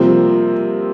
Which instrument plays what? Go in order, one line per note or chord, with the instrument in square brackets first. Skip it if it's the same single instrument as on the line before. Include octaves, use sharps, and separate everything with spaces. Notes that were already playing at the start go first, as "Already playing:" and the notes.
Already playing: [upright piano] C3 F3 C4 [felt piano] G3 A#3